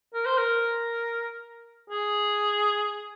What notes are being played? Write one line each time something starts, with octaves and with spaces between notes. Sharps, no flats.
A#4
C5
A#4
G#4